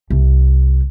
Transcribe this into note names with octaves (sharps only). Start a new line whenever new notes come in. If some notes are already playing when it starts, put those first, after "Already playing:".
C2